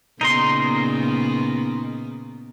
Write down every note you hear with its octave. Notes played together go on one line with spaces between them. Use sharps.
A#2 C#3 B3 D#4 A#4 C6